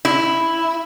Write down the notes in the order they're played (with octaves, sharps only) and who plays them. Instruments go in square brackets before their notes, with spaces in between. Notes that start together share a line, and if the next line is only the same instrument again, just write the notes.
[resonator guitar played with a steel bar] E4